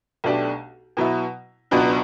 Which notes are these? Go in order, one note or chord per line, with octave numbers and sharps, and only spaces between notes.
B1 B2 A3 D4 G4
B2 F#3 B3 E4
C#2 B2 F#3 B3 D4